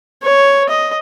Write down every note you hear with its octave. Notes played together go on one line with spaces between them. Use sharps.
C#5
D#5